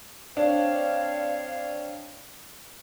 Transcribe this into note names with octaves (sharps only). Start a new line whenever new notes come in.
C4 D4 C#5 F5